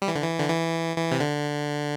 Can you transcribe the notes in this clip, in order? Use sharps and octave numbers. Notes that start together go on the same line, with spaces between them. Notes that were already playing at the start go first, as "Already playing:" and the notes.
G3
E3
D3
E3
D3
E3
E3
C3
D3